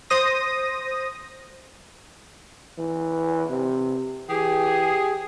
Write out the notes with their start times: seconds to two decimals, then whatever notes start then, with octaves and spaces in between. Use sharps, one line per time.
0.10 C5 D#6 A#6
2.78 E3
3.49 C3
4.29 E3 G4 G#4